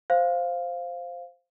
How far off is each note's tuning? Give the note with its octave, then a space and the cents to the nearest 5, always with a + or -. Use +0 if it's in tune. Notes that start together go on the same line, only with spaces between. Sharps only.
C5 +0 F5 +0